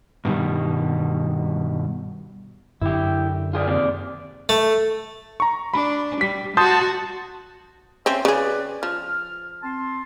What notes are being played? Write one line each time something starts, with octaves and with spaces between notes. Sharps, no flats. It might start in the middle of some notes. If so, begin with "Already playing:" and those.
G2 B2 D#3 G3
F#2 D3 E4 G4
F4 G#4 D5
D#2 C3 D5
A3
A#5 C#6
D4 B5
G3 B6
F#4 A5 C6 D#6 G6
C4 C#4 C5 E5 C6
C#3 G#4 B4 D5
F3 F6
C4 A5 C6